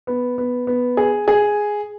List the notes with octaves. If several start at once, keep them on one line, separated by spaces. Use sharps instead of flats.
B3
B3
B3
G#4
G#4